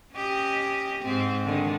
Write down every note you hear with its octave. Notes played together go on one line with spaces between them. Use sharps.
C#4 G4 D#5
G#2 C4
D3 D#3 G#3